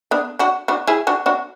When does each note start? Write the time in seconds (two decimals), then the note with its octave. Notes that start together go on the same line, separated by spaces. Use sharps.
0.11 B3 D4
0.39 D4 F#4
0.68 D4 F#4
0.87 E4 G#4
1.07 D4 F#4
1.26 D4 F#4